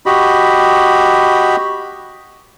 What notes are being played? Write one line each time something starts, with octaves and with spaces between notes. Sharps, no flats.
F#4 G4 D#5 B5